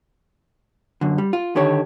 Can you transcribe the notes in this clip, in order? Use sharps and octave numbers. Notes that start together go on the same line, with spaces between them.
F#2 D3
G3
F4
D3 D#3 G4 C#5